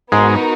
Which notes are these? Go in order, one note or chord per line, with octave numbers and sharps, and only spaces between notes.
G#2 G#3 B3 D#4 F#4 A#4